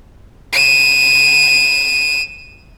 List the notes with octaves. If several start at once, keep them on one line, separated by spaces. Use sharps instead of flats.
D#7 E7